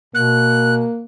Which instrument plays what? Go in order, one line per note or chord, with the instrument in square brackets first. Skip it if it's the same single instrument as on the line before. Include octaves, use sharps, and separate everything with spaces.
[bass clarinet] B2 [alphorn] A#3 [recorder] F#6